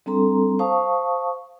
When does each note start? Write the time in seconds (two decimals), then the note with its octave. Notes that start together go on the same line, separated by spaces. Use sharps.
0.06 G3 C4 D4 A4 A#5 C6
0.59 C5 F5 A5 C#6 D#6